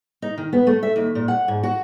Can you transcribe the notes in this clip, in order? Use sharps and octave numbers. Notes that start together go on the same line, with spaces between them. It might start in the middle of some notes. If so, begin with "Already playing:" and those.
D#4
D#3
B3
A3
E5
D#2
A#2
F#5
G#2
F#4